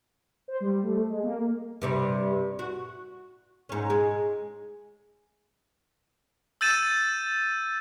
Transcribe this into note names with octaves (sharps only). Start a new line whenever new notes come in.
C5
G3
A3
G#3
A#3
G2 C3 G3
F#4
G#2 C#4
G#3
E6 G6 A6 D#7 E7